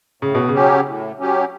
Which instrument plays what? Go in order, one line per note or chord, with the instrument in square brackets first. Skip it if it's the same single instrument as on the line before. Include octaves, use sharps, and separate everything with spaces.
[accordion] A2 [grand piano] C#3
[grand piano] B2
C#3
[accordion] F#3 C#4 G4
A2
F#3 C#4 G4